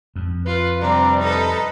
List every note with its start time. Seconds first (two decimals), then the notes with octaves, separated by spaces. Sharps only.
0.16 F2
0.46 F4 B4
0.81 C3 G3 C4 D4 A#5
1.19 D#4 A4 B4